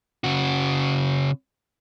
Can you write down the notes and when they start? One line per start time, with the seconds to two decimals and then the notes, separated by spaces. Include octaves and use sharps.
0.24 C#3 F#4